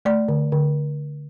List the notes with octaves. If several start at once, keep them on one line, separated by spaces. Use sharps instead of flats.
A3 D5
D3
D3